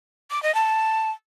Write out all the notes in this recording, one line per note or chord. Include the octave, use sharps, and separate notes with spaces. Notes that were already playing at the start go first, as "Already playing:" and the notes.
D6
D#5
A5